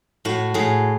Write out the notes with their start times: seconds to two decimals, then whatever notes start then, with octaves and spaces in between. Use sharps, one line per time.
0.25 A2 F#4
0.54 A2 G#4